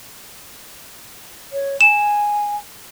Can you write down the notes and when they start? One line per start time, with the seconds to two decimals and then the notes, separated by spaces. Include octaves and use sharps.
1.52 C#5
1.81 G#5 E7